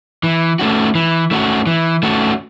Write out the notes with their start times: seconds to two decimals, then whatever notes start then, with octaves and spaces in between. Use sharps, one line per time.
0.23 E3
0.59 A3 C#4 F#4
0.95 E3
1.31 A3 C#4 F#4
1.66 E3
2.03 A3 C#4 F#4